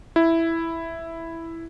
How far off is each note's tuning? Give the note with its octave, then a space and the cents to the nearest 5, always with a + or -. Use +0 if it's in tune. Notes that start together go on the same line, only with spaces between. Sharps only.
E4 +0